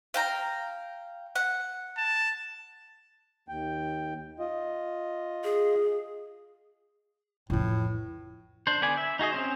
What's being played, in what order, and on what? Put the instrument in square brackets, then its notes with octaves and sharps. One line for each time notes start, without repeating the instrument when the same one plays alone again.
[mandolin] F5 G5 A#5
F#5
[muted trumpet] A5
[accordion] D#2 G5
F4 D#5
[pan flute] G#4
[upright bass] F2 E3 [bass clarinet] A2
[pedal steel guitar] D4 C5
D3 B3 D5 G#5
E5
D#4 F#4 G#4 D#5
C4 C#4 C5